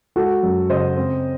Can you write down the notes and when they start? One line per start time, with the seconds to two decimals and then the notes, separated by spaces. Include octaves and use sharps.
0.16 G#3 F#4 A4
0.43 F#2
0.69 C#3 C5 D#5
0.97 C4